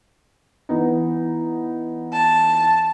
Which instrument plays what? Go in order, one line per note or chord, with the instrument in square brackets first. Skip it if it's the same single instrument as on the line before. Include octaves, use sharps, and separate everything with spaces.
[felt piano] E3 B3 D#4
[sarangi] A5